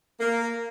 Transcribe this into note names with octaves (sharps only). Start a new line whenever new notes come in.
A#3